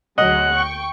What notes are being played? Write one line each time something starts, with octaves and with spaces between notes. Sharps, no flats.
D2 F#3 G#3 D#5 F#5
G5 C#6